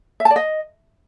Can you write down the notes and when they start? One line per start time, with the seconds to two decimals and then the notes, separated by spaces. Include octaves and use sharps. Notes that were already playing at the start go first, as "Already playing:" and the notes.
0.20 E5
0.25 A5
0.31 D5
0.36 D#5